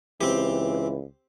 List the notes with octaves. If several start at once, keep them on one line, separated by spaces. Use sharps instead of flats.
C#2 E3 C4 G4